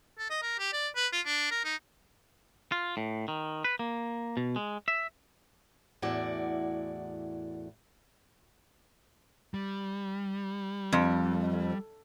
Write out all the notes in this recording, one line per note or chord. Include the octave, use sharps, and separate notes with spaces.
A4
D#5
A#4
G4
D5
B4
F4
D4
A#4
D#4
F4
A2
D#3
B4
A#3
B2
G#3
E5
E2 A2 E4 F#4 D5
G3
F2